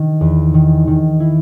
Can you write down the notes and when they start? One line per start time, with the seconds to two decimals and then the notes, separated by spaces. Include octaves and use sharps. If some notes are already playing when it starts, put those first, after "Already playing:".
Already playing: D#3
0.21 E2
0.54 D#3
0.87 D#3
1.20 E4